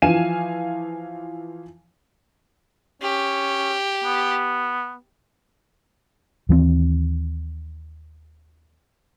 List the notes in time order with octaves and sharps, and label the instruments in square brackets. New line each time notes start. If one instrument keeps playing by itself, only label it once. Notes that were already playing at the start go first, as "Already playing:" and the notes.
[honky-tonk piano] E3 F3 F5 G#5 D#7 E7
[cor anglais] C#4 [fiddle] G4
[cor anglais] B3
[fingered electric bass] D#2 E3 A3 C4